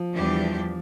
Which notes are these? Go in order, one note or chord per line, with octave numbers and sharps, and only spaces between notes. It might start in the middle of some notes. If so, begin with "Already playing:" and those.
Already playing: F3
E2 E3 G3 D4 G4